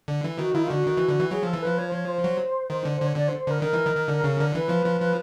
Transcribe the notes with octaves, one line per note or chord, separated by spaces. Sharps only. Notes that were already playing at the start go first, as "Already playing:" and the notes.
D3
E3
D#3 F#4
D#3 E4
F4
D3 F#4
D#3
E3
D3
E3
F#3 G#4
F3 A4
E3
F3 B4
C#5
C5
C#5
C5
F#3
D#3
D3
D3 C5
C#5
D3 D5
C5
C5
D3 A#4
D#3 A#4
E3
D#3
D#3
D3
C#3
D3
E3 B4
F3
F3
F3